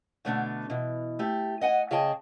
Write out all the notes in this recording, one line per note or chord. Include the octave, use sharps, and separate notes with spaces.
B2 D3 A3 B3 C4 D4
B2 E3
A3 G4
D#5 F#5 G#5
C#3 G#4 D#5 G5 A5